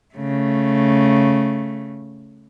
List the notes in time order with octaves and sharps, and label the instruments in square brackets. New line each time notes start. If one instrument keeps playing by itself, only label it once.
[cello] C#3 A3